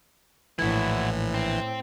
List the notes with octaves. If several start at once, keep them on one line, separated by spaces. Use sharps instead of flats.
A#1 A2 E3 E4 F#4
C4